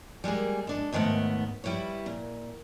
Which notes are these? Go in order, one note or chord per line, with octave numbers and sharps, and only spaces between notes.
G3 G#3 A#3 G#4
G#3 D4 A4
D#2 G#2 D#3 A3 B3
G3 E4 B4 C#5
A#2